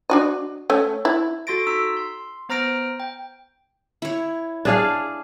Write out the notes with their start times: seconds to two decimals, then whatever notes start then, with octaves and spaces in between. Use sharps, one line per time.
0.10 D4 F#4 D#5
0.70 A3 C#4
1.05 E4
1.47 F#4 A4 C6 A6 A#6 D7
1.67 D#4 A#5 E6 B6
1.97 C6
2.49 B3 C5 A#5 F6 A#6 D7
3.00 G5
4.02 E4 C#5
4.65 D4 G#4 F5 A5